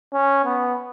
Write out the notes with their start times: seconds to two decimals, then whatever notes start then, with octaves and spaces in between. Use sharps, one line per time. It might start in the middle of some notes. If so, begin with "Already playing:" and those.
0.13 C#4
0.45 B3